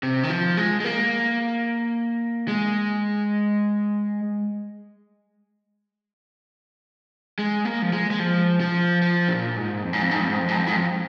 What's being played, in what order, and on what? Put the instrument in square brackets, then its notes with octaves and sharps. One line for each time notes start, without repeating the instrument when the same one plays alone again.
[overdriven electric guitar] C3
D#3
F3
G#3
G#3
A#3
G#3
G#3
A#3
F3
G#3
G#3
F3
F3
F3
A#2
G#2
F2
G#2
F2
G#2
F2
G#2
F2
G#2
F2
G#2
F2